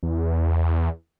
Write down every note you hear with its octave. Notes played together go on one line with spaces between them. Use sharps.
E2